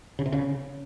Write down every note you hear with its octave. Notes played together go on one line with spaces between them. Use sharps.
C#3
C3
C#3